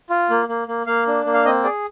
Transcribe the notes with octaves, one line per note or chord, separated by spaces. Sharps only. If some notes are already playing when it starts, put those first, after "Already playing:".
F4
A#3
A#3
A#3
A#3 F5
D4
A#3
F5
C4 D#5
G#4 D5